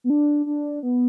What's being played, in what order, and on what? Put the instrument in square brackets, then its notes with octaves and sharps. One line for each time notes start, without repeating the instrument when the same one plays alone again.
[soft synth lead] B3
D4
D4
B3